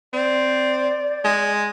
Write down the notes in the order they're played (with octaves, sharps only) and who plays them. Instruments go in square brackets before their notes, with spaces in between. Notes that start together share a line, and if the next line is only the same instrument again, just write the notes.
[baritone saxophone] C4 [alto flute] D5
[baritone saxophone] G#3